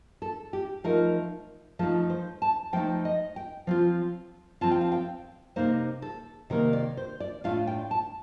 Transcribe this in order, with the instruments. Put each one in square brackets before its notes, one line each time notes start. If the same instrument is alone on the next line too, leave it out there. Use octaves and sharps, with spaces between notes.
[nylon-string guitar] A4
G4
F3 A3 D#4 A#4
F3 A3 D#4 A4
C5
A5
F3 A3 D#4 G5
D#5
G5
F3 C4 F4
F3 C4 F4 A5
G5
F5
G5
C3 D#3 A#3 D#4 C5
A4
C3 D#3 A#3 D#4 A#4
D5
C5
D5
A2 A3 D4 F4 F5
G5
A5